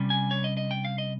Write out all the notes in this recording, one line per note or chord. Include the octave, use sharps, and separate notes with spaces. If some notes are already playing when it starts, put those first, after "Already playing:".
Already playing: C3 G3 C#4
G#5
C#5
D#5
D#5
G5
F5
D#5